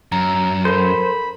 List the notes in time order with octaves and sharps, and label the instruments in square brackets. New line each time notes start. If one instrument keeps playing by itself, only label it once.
[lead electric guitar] F#2 [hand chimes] A#5
[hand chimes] A4 A#4 [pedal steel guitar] C5 [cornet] B5